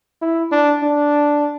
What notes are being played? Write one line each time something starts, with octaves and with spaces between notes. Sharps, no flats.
E4
D4
D4